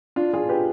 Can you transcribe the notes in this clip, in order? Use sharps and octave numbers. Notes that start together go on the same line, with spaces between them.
D4 F4
F4 G#4
G4 B4